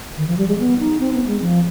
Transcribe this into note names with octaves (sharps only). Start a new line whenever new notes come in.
D#3
F3
G3
G#3
B3
D#4
C4
B3
G#3
F3